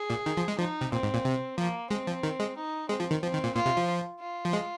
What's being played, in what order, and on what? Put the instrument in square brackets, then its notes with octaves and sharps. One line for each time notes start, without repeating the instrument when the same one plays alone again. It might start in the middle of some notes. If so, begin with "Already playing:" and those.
Already playing: [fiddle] G#4
[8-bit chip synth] A#2
D#3
F3
G#3
[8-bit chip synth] F3 [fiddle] D#4
[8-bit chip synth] C3
[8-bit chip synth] A#2 [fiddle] C4
[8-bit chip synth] G#2
A#2
C3
[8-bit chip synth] F3 [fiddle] A#3
[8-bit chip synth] G#3 [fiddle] C4
[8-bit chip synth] F3
D#3
G#3
[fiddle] D#4
[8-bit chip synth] G#3 [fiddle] C4
[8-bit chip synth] F3
D#3
[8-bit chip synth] F3 [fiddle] C4
[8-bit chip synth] D#3
A#2
[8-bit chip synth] A#2 [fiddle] F4
[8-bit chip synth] C3
F3
[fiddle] F4
[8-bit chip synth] F3
G#3